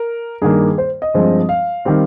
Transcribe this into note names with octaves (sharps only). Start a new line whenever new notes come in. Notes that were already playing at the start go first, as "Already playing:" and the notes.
Already playing: A#4
G2 D#3 A#3 G#4
C5
D#5
G2 F3 G#3 C4
F5
D#3 G3 C4